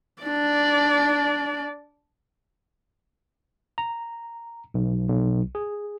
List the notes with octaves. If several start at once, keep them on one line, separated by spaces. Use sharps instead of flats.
D4 D5
A#5
B1
B1
G#4